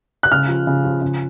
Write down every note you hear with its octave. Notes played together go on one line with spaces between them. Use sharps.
F#6
C#3 F6
F3
C#3
F3
C#3